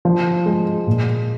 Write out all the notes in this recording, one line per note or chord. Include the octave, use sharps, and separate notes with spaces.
F3
G#3
A#2